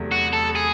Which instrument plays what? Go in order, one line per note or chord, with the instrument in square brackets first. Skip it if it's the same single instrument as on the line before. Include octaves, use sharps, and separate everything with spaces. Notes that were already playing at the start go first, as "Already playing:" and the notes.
Already playing: [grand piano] E2 C3 F#3 A3
[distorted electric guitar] F#4
A4
G#4